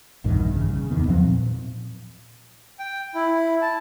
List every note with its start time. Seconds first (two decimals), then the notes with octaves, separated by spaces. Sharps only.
0.24 A#1 E2 G2 D#3
0.51 A#1 G2 C#3
0.70 C#3
0.90 D1 E2 D#3 B3
1.09 E2 F3 F#3 C4
1.25 A#2
2.79 G5
3.15 E4
3.62 A5